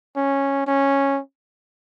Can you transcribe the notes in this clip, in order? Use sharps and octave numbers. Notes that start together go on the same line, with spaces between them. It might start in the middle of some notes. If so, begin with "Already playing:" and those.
C#4
C#4